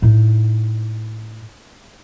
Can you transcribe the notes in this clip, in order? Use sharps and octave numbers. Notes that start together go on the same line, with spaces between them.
A2 D#4